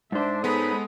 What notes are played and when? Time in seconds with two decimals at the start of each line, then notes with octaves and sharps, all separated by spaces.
0.12 G#2 D4 C5 E5
0.44 G#3 B3 C#4 D#4 A4 B5 D#6